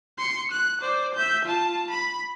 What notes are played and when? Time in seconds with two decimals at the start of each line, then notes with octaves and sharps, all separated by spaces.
0.18 C6 C#7
0.51 F#6
0.80 C5 D5
1.14 E5 G6
1.45 F4 A5
1.90 B5